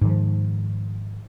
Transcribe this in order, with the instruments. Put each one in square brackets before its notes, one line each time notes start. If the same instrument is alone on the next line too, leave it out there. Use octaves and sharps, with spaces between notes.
[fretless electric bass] G#2 D#3 F3